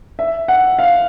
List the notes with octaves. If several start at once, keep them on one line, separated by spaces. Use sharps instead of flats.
E5
F#5
F5